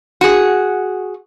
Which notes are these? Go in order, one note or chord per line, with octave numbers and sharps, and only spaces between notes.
F#4 G#4